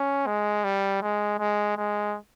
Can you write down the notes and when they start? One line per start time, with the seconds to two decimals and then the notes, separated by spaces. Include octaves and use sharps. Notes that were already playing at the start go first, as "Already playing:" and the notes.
Already playing: C#4
0.27 G#3
0.64 G3
1.02 G#3
1.39 G#3
1.77 G#3